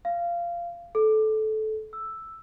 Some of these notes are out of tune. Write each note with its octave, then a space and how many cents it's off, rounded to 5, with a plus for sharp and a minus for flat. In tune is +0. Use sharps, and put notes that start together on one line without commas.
F5 -15
A4 -20
E6 +0